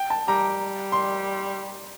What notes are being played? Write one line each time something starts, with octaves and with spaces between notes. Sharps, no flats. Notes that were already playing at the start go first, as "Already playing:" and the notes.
Already playing: G5
A5
G3 A#5
C6